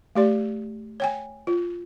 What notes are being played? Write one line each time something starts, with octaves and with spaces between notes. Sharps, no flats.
A3 G4 D5
C#5 G5 G#5
F4